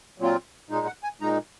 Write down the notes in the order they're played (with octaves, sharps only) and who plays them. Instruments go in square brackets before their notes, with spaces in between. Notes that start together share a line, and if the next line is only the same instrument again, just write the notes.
[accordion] A#2 F#3 C4 F4
A#2 G#3 D#4
F#5
G#5
A#2 G#3 D#4 A#5